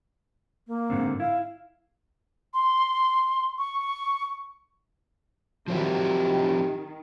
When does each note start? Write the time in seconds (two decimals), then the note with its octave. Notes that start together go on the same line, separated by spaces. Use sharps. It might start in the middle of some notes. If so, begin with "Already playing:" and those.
0.67 A#3
0.90 G#2 D3 C4
1.20 E4 F5
2.54 C6
3.58 C#6
5.68 D#3 F3 F#3 C4 E4 G4